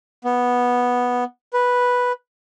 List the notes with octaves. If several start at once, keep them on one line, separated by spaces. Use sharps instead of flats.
B3
B4